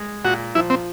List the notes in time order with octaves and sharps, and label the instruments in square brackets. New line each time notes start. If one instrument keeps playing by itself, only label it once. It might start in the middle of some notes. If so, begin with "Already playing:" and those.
Already playing: [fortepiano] G#3
[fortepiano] A#2 [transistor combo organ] F#4
[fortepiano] F3 [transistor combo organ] E4
[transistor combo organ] C4